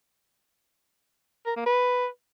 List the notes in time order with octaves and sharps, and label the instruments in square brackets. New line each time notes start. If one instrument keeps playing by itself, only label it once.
[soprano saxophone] A#4
A#3
B4